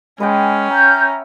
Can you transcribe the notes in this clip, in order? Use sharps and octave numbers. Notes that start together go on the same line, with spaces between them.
G#3 C#4 B4 F#5 G5
E5 A#5 F6 G6